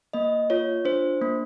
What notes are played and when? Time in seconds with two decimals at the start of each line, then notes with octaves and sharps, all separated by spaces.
0.13 A#3 D#5
0.50 F4 C#5
0.85 D4 C5
1.22 A#3